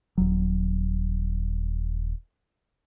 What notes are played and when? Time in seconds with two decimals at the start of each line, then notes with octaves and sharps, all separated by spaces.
0.18 D#1 F#3